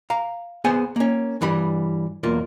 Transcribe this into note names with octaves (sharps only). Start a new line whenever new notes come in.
F5 A#5
B3 G#4 C5 F#5 G#5
A#3 C#4
G2 E3 G3 B5
B1 E2 A#3 F4